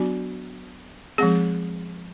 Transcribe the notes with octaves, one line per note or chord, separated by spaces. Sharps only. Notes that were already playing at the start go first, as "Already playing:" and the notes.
Already playing: F#3 B3 D4 F#4
F3 G#3 C4 G#4